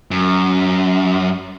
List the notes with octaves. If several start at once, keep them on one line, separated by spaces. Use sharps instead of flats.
F#2